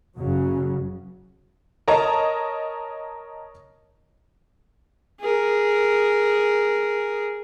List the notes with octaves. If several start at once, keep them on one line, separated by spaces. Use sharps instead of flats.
F#1 C#3 F#3
A#4 C#5 D#5 A5 A#5
G#4 A#4